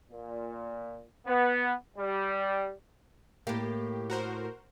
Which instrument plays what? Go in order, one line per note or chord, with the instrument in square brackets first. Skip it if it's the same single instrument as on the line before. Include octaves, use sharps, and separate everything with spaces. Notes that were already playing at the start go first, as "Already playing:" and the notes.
[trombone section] A#2
B3
G3
[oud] A2 A#3 [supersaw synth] G4
[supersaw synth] F#4 A#4 C5